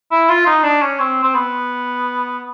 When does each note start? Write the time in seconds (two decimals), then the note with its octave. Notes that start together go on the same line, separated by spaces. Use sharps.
0.11 E4
0.29 F4
0.46 D#4
0.64 D4
0.82 C#4
1.00 C4
1.23 C4
1.35 B3